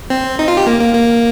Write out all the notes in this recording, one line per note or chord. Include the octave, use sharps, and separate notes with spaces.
C4
D#4
F4
G4
A#3
A#3
A#3